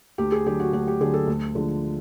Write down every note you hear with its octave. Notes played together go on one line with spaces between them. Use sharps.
D2 G4
G#4
D3 F#3 G4
F#4
D2 F#4
G4
D3 F#3 G#4
A4
D2
D3 F3 G#3